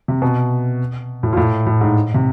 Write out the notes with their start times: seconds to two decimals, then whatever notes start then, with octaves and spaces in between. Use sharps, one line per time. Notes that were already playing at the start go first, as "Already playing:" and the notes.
0.08 C3
0.22 B2
1.23 A2
1.33 A#2
1.37 A2
1.66 A2
1.81 G#2
2.14 C3